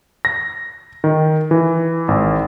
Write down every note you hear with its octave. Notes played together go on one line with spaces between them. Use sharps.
A#6
D#3
E3
G#1